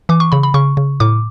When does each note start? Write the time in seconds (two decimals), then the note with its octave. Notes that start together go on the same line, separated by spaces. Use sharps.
0.09 E3 D6
0.20 C#6
0.32 C#3 B5
0.43 B5
0.54 C#3 C#6
0.77 C#3
1.00 A2 D6